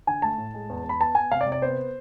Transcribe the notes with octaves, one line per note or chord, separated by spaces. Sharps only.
D3 G#5
A3 A5
A2
G#3
E2
E2
B5
B3 A5
B3 G#5
C3 F5
D5
C3
D5
B3 C5